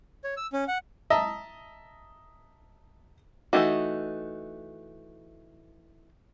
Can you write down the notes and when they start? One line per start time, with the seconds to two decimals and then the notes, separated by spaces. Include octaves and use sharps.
0.24 C#5
0.37 E6
0.53 C#4
0.68 F#5
1.10 D#5 E5 A5 A#5
3.53 E3 G#3 A3 D#4 F#4